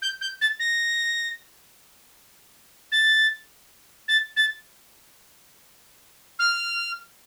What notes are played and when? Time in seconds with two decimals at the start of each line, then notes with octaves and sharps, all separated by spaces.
0.02 G6
0.21 G6
0.41 A6
0.59 A#6
2.92 A6
4.08 A6
4.36 A6
6.39 F6